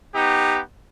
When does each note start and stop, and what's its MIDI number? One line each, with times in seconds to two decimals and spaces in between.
0.14 0.60 59
0.14 0.60 63
0.14 0.60 67